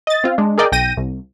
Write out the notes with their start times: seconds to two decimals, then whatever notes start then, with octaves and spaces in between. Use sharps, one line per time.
0.07 D#5 A6
0.24 C4 F4
0.38 G#3 D4
0.58 G#4 A#4 D5 D#5 G5
0.72 B1 G5 A#6 D#7
0.97 C2